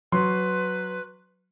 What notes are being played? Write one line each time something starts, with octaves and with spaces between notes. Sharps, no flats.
F#3 B4 C6